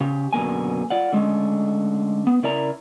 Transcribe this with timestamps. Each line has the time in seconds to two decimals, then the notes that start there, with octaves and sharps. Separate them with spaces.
0.01 C#3 G4
0.33 F#2 B2 D3 A#3 G#5
0.90 F4 D5 F#5
1.13 D3 G#3 A3 C#4
2.27 B3
2.43 C#3 E4 A#4 D5 E5 A#5